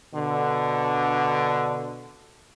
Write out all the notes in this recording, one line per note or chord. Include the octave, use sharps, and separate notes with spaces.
B2 D3